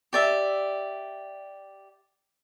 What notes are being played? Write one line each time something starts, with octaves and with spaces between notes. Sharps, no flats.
G4 D5 E5